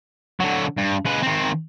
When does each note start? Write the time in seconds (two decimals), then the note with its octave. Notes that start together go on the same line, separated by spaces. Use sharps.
0.40 D3 F#3
0.77 G2
1.05 G#3 B4
1.22 D#3 C4